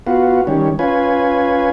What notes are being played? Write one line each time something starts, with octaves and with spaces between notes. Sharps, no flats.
B3 F4 F#4
D#3 G3 C#4
C#4 F4 B4 G#5